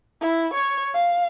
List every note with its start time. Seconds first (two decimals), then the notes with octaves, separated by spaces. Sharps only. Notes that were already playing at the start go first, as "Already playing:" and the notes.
0.22 E4
0.54 C#5
0.94 F5